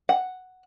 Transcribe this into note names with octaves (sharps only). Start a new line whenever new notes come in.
F#5